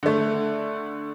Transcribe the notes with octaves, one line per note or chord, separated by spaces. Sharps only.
D3 A3